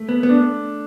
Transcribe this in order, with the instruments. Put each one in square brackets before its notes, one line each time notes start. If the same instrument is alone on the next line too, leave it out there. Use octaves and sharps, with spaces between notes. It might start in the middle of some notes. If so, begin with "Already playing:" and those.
Already playing: [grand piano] A3
[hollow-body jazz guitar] B3
B3
[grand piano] D4